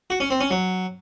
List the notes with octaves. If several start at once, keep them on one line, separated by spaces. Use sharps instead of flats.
F#4
C#4
C4
C#4
F#3